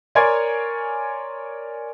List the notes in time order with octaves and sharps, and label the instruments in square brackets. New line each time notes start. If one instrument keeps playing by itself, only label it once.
[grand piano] A#4 C#5 D5 G#5 C6 G#6